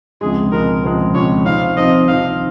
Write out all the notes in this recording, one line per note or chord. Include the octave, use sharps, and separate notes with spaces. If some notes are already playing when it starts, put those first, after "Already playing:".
C#2 C3 F3 G#3 G#4
C#2 C3 F3 G#3 A#4
C#2 C3 F3 G#3
C#2 C3 F3 G#3 C#5
C3 F3 C4 D#4 F5
C3 F3 C4 D#4 D#5
C3 F3 C4 D#4 F5